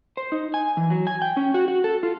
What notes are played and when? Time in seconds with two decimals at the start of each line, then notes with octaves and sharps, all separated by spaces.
0.17 C5
0.32 D#4
0.54 G#5
0.77 E3
0.90 F#3
1.07 G#5
1.22 G5
1.37 C#4
1.54 F#4
1.68 F#4
1.84 A4
2.03 F4